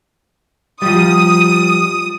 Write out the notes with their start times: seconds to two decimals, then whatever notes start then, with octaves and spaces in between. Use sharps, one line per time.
0.82 F3 G3 D#6